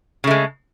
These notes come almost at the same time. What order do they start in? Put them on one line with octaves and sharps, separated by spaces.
C#3 A3 G#3